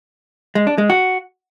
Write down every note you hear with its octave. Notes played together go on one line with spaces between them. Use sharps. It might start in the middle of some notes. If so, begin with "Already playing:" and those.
G#3
D4
G#3
F#4